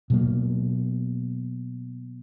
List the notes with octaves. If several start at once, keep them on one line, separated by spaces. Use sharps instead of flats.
B2 F#3 A#3